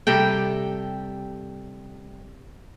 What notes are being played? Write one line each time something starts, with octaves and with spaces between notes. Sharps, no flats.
C3 G3 A4 G5